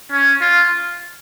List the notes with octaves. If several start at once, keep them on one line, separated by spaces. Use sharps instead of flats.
C#4
F4